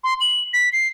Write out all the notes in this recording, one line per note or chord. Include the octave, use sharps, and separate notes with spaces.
C6
F#7
B6
C7